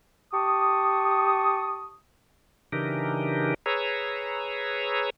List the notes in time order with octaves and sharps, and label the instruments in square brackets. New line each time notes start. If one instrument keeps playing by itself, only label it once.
[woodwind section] G4 A5 C#6 D#6
[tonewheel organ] C#3 E3 D4 D#4 G4 A#4
G#4 B4 C#5 A#5 E6